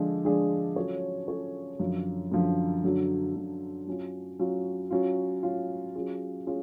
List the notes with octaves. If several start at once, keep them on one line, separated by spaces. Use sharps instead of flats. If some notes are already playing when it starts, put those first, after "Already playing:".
Already playing: D3 F3 G#3 D4 G#4
D3 F3 G#3 D4 G#4
F#3 C#4 F4 A4 C#5
F#3 C#4 F4 A4 C#5
F#2 D3 F3
F#2 D3 F3
F#2 D3 F#3
F#2 D3 F#3
F#3 C#4 F4
F#3 C#4 F4
F#3 C#4 F4
F#3 C#4 F4
F#3 C#4 F4 G#4
C#4 F4 G#4